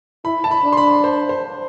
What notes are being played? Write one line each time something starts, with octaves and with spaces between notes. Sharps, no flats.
E4 B5
A5
B5
D4
C6
B5
C5
C5